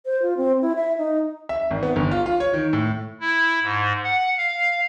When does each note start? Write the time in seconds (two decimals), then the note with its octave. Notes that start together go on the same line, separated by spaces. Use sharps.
0.06 C5
0.22 F4
0.37 C4
0.62 E4
0.76 E5
0.98 D#4
1.49 E5
1.71 G#1
1.83 B3
1.96 G1
2.11 F4
2.26 F4
2.40 C#5
2.54 D#3
2.73 A2
3.21 E4
3.63 G#2
4.04 F#5
4.37 F5